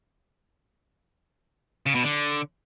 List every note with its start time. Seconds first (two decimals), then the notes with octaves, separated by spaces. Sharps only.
1.86 C#3
1.95 B2
2.04 D3